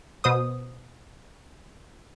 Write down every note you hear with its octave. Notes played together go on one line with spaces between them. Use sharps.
B2 C5 D#6